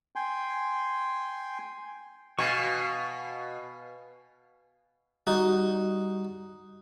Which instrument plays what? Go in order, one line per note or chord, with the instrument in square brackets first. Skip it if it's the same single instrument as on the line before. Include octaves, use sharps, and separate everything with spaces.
[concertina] G5 G#5 C6
[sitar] B2 [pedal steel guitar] F5 G#5 C#6
[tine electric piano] G3 [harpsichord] D#4 F#4